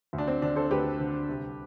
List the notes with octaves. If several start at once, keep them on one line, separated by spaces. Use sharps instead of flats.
D2
D4
C4
D3 D4
A4 C5
D2 G4 B4
D3
C2